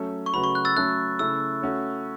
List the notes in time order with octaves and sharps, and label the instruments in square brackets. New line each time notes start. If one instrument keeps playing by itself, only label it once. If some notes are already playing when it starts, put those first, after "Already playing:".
Already playing: [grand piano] F#3 A3 C#4 A4
[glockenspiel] C#6
[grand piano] C#3 F#3 A3 F#4 B4 [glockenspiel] B5
[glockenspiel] C#6
F#6
E6 A6
[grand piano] F#3 A3 C#4 A4 [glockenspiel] F#6
[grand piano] C#3 A3 E4 [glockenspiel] E6
[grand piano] A3 C#4 F#4 C#5